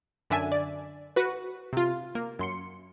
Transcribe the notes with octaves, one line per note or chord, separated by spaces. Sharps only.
F#2 D3 D4 E5 G#5
D5
F#4 B4
C3 F4
A#3
F#2 C6 C#7